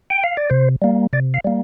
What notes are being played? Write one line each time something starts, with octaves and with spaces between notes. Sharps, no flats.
G5
F5
D5
C3 C5
G3 A#3
C3 D5
F5
G3 A#3